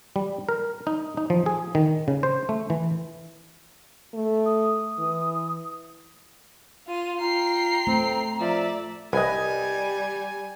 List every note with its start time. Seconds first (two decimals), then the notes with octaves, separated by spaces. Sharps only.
0.16 G3
0.49 A#4
0.87 D#4
1.17 D#4
1.30 F3
1.46 G#4
1.75 D#3
2.08 C#3
2.23 C5
2.49 A3
2.70 E3
4.14 A3
4.46 D#6
4.99 E3
6.87 F4 D#7
7.20 F4 G5 A#5 C7
7.87 A3 C4
8.40 F3 D5 E5
9.13 C2 G3 B4 D#5 G#5